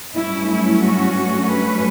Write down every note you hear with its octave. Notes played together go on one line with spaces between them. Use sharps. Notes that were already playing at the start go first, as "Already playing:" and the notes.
G2 F#3 A3 C#4 E4
E4
F#4
B4